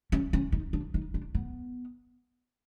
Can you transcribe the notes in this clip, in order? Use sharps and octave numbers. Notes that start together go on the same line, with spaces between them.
C#4
C#4
D#4
D4
D#4
D4
B3